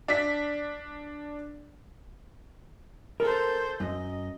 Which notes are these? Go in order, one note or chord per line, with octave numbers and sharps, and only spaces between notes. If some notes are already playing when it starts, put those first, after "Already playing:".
D4 B6
A4 A#4 C5
F#2 D#5